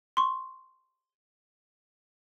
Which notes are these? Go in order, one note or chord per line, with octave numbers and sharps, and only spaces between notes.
C6 C#6